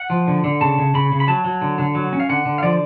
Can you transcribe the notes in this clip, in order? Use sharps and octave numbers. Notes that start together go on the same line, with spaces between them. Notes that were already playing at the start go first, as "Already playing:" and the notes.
Already playing: F#5
F3
D3
D3
C#3 A5
C#3
C#3 B5
C#3
B5
F#3 A5
F#3
D3
D3
F#3
C#4
F5
D3 F#5
D3
F5
F3 D5